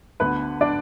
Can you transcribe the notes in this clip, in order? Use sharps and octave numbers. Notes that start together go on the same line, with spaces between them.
D2 D3 B3 B4
D4 D5